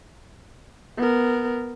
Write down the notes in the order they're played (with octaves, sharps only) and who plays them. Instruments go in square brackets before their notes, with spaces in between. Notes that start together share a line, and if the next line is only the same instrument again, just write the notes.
[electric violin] B3 A#4